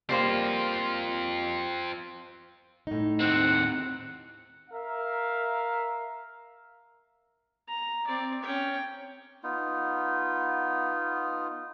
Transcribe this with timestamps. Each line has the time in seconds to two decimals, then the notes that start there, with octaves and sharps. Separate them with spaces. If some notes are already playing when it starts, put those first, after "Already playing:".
0.09 G3 A#3 C4 F4 C5
2.87 A2 D#4
3.21 D#2 C4 F#5
4.70 A#4 E5 F5
7.68 A#5
8.07 C4 D5
8.43 C#4 G5
9.44 B3 D#4 F4